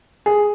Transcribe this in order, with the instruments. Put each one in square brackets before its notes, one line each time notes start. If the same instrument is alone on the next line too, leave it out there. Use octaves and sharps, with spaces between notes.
[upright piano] G#4